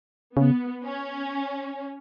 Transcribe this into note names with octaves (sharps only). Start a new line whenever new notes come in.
C#3 B3
C#4